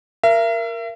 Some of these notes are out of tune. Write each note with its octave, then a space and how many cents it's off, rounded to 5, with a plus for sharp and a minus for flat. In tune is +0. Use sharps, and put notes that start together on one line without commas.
A#4 +0 E5 +40